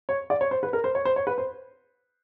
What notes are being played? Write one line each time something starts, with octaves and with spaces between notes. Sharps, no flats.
C#5
D5
C#5
C5
B4
A#4
C5
C#5
C5
C#5
B4
C5